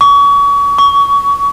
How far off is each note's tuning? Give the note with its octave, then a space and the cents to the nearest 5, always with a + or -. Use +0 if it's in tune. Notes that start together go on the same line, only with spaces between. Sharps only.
C#6 +35
C#6 +25